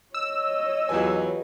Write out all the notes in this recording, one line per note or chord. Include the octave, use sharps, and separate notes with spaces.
C#5 D#5 E6
E2 F#3 F4 G4 B4 G#5